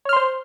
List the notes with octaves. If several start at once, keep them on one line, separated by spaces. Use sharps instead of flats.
C5 C#5 C6 F6